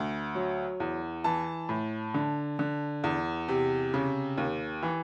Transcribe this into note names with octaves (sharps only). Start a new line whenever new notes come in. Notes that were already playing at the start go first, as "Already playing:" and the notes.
Already playing: D2
F#3
E2
E3 A5
A2
D3
D3
E2
C3
C#3
D#2
E3